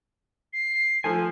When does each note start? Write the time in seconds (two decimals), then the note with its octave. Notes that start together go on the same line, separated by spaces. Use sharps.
0.53 C7
1.04 F3 A3 G#5